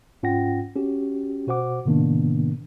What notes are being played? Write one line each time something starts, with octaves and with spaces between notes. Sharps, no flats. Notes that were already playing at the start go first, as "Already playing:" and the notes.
G#2 C#4 F4 F#5 G5 A#6
C#4 F#4 G4
B2 F#4 C5 F#5 D6
A2 C3 D#3 A#3 B3 D4